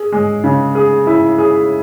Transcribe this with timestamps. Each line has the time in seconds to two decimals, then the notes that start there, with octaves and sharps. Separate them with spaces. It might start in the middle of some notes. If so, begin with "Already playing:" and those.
Already playing: G#4
0.12 G#3
0.44 C#3
0.75 G#4
1.07 E4
1.38 G#4